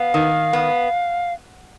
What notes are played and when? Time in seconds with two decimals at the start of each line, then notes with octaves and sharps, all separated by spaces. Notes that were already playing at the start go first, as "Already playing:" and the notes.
Already playing: B3 F5
0.14 D#3
0.53 B3